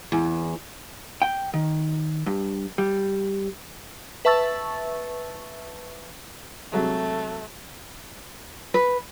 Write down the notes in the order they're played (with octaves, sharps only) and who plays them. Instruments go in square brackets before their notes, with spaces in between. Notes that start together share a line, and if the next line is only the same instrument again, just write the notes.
[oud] E2
[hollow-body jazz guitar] G5
D#3
G2
G3
[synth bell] B4 E5 A5 C#6 E6 A6
[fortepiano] C3 F#3 G#3 [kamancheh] A3
[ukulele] B4